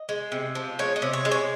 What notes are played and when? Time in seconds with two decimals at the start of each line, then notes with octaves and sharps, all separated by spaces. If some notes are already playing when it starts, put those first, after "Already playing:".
Already playing: D#5
0.09 G#3
0.32 C3
0.55 F3
0.79 G#3 C#5
0.96 D#5
1.02 C3
1.13 C#5
1.25 G#3
1.31 C#5